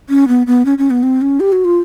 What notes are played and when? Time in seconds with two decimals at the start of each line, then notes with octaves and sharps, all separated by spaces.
0.10 C#4
0.28 B3
0.47 B3
0.65 C#4
0.78 C#4
0.90 B3
1.03 C4
1.21 C#4
1.40 G4
1.52 F#4
1.65 F4